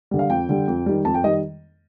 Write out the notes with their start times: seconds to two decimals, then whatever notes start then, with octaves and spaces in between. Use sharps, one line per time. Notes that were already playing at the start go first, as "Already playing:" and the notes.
0.11 D3 G3
0.19 F5
0.30 F2 G5
0.49 D3 G3
0.68 F2
0.86 D#3 G3
1.05 F2 A5
1.14 G5
1.24 D#3 G3 D#5